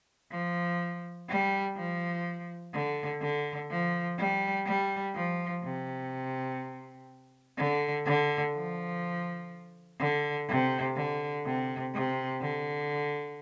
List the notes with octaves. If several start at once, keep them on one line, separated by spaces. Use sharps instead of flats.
F3
G3
F3
D3
D3
F3
G3
G3
F3
C3
D3
D3
F3
D3
C3
D3
C3
C3
D3